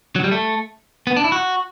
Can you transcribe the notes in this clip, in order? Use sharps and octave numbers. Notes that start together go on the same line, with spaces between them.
F#3
G3
A3
B3
D4
E4
F#4